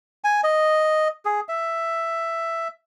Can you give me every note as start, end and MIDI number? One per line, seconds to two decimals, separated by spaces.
0.24 0.41 80
0.44 1.08 75
1.25 1.40 68
1.49 2.68 76